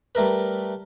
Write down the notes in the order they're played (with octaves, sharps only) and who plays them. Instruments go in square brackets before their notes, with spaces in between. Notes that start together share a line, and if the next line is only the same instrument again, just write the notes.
[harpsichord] G3 A3 A#4 B4